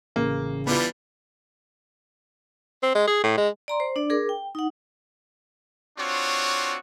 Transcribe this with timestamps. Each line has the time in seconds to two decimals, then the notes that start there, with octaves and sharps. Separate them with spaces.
0.16 A1 C#3 A#3
0.67 E3 G3 B3 D4 F4
2.83 C4
2.95 G#3
3.07 G#4
3.24 A2
3.37 G#3
3.68 D5 A#5 C6
3.80 C5
3.96 D4 D5
4.10 G#4 A#4 D6
4.29 G5
4.55 D#4 F#5
5.98 C4 D4 F4 F#4 C#5